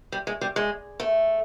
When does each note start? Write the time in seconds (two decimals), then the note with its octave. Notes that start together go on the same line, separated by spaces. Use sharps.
0.12 G3
0.27 G#3
0.41 G3
0.56 G#3
1.00 A3